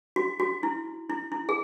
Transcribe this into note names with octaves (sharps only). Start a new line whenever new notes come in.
F#4
F#4
E4
E4
E4
G#4